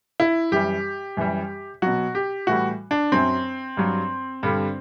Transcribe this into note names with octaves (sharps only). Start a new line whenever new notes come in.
E4
F#2 E3 G3 G4
F#2 E3 G3
B2 F#3 F#4
G4
A2 E3 G3 F#4
D4
F#2 F#3 C4
G2 F#3
G2 D3 G3